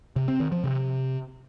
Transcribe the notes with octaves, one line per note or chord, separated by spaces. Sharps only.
C3
C4
D#3
F3
C3